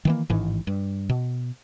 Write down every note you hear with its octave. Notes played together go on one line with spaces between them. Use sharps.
D#3 E3 A#3
A1 G#2 D#3 E3
G2
B2